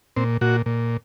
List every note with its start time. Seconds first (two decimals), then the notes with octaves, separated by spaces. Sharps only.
0.16 A#2 C4
0.41 A#2 F#4
0.66 A#2